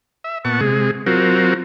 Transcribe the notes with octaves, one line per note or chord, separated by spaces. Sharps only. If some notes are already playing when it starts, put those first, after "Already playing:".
E5
A#2 B3 F#5 A5 C#6
C3 G#3 G#4
F#3 C4 F4 F#4 A#4